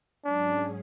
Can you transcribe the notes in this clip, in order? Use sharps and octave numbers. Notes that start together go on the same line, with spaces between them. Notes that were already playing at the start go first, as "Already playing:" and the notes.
G#2 F#3 C#4 D4 G#4